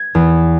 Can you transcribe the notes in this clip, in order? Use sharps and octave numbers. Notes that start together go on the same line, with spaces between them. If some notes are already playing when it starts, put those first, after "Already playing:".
Already playing: G#6
E2